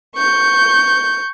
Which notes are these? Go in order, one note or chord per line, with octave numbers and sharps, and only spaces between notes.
C#6 G6